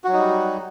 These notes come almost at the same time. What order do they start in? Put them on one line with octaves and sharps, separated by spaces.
F#4 F#3 D#4 G3